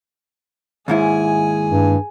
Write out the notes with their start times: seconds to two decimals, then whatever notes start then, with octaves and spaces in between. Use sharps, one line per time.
0.88 D#2 G#2 E4 G#4 G#5
1.69 G2